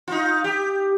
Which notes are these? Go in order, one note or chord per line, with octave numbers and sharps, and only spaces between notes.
D#4 F4
G4